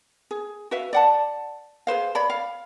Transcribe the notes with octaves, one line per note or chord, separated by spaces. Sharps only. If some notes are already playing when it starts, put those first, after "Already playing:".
G#4
F#4 B4 E5 F5
D5 F#5 A5
G#4 B4 C5 F5
C#5 D5 B5
F5